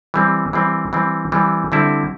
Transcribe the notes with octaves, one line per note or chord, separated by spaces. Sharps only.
E3 G3 C4
E3 G3 C4
E3 G3 C4
E3 G3 C4
D3 G3 C4 E4